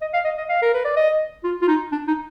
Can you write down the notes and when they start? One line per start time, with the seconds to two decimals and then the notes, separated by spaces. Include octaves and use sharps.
0.01 D#5
0.14 F5
0.25 D#5
0.38 D#5
0.49 F5
0.62 A#4
0.74 B4
0.85 D5
0.96 D#5
1.44 F4
1.61 F4
1.68 D#4
1.92 D4
2.08 D#4